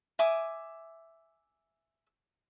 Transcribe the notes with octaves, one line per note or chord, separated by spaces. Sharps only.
E5 G#5 D6 D#6